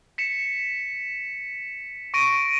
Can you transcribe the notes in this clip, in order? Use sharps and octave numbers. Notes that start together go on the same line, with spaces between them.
B6 C#7 E7
C#6 A#6 D7 D#7